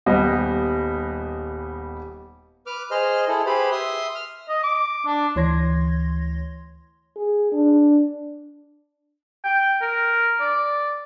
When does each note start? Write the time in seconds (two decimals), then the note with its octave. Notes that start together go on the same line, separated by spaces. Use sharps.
0.06 D#1 G3 B3 D#5
2.66 B4 D6 F6
2.91 G#4 C5 D#5 F6
3.28 E4 G#4 A4
3.46 G4 G#4 B4 C5 B5
3.72 E5 C6 D#6
4.15 F6
4.49 D#5
4.63 D6
5.06 D4
5.36 D2 E3 C#5 C6 G#6 A#6
7.16 G#4
7.53 D4
9.44 G5
9.82 A#4
10.40 D5